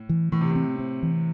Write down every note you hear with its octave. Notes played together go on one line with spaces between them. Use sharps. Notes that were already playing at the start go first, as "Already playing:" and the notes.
Already playing: A2
E3
A2 E3
C3
A2 C4
C4
E3